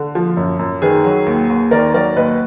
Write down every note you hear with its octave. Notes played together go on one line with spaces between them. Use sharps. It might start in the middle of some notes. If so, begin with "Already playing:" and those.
Already playing: D3
F3
F#2
F#2
D#3 G#4 B4
F#3
D#2
D#2
D#3 A#4 D5
F#3 A#4 D5
D#2 B4 D#5